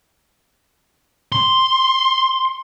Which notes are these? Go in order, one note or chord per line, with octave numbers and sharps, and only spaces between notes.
C6